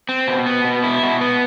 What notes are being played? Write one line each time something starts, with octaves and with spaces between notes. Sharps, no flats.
C4
B2
B3
B2
E4
B2
B3